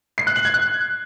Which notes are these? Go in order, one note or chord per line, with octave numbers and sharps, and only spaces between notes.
C7
F#6
F#7
G#6
F#6